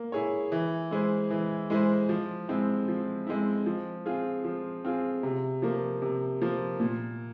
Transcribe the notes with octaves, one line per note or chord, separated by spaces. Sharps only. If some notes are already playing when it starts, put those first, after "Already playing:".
Already playing: A#3
E4 G#4 C#5
E3
G#3 E4 G#4 C5
E3
G#3 E4 G#4 C5
F3
G#3 C4 E4
F3
G#3 C4 E4
F3
C4 F4 G#4
F3
C4 F4 G#4
C3
F3 A#3
C3
F3 A#3
A#2